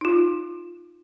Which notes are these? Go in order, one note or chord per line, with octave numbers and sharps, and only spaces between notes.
D#4 F4